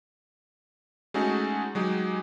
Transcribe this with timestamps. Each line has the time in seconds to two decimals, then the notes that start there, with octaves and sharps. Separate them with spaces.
1.14 G#3 A3 C#4 D#4 F#4 G#4
1.75 F#3 G#3 D#4 G4